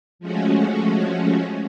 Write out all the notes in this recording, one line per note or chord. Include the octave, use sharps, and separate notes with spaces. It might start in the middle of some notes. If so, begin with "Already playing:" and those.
F3 G#3 A3 C#4 F#4